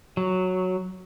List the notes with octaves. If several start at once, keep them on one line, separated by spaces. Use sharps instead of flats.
F#3